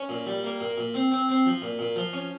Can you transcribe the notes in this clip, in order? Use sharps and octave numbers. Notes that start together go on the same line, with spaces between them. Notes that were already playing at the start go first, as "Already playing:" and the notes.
Already playing: C#4
A#2
G3
A#3
A#2
A#2
C4
C4
C4
F3
A#2
A#2
F3
C#4